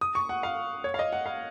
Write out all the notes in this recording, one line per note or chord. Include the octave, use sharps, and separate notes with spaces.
D#6
C#6
F#5
F5
C#5
F5
D#5
F#5
F5